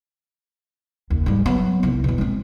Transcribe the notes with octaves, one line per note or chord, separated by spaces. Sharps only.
F#1 D#2
G#2 G3
F#3 B3
C2 D#4
E2 B2
G#3 C4